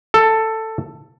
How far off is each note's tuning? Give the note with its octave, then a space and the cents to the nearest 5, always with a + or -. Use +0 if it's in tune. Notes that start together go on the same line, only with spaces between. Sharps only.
A4 +10